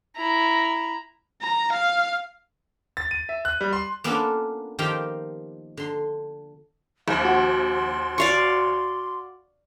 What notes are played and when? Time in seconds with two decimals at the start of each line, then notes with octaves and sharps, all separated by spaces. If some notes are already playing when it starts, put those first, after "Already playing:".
0.17 E4 A#5
1.42 A#5
1.72 F5
2.97 A6
3.11 D#7
3.29 E5
3.45 F#6
3.61 G3
3.73 C6
4.04 A#3 B3 C#4 D4 F4 A4
4.79 D#3 F3 F4 G4 F5 G5
5.77 D3 C6
7.08 A#1 D#2 F5
7.25 F#4 C6
8.18 D5 F5 C#6